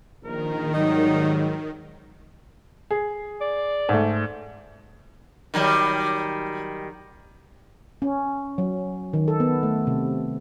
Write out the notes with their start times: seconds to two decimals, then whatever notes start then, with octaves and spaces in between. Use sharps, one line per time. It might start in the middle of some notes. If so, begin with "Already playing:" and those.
0.23 A#1 D#3 A#4
0.74 G#2 F#3 G3 D#4
2.91 G#4
3.41 D5
3.89 G#2 A3
5.54 D#3 F#3 G3
8.02 C#4
8.58 F#3
9.13 D#3
9.28 A4
9.40 B3
9.63 A3
9.87 C3